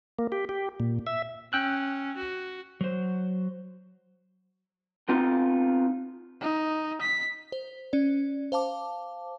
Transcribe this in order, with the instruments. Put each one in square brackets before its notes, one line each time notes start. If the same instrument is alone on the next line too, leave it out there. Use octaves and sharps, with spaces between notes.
[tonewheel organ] A#3
G4
G4
A#2
E5
[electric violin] C#4 [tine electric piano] G5 E6 F#6
[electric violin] F#4
[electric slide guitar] F#3 C5
[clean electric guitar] B3 C4 D#4 F4
[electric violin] D#4
B6
[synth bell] C5
C#4 D5
C5 F5 A5 D6